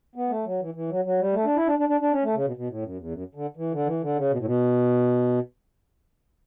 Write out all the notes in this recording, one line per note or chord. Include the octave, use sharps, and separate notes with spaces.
B3
A3
F#3
E3
E3
F#3
F#3
G3
A3
D4
E4
D4
D4
D4
D4
C#4
A3
C#3
B2
B2
A2
F#2
E2
F#2
D3
E3
D3
E3
D3
C#3
B2
A2
B2